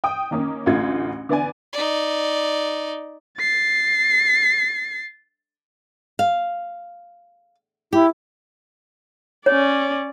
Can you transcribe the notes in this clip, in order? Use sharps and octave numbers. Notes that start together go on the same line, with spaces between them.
G5 D#6
D#3 A#3 C#4
A1 D2 A3 F4 G#6
D3 B3 D5 G#5
D#4 D5
A6 C7
F5
E4 G4
C#4 C#5 D5